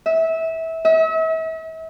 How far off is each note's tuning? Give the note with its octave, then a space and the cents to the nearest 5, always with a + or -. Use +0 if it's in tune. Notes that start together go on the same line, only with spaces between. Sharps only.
E5 -20
E5 -40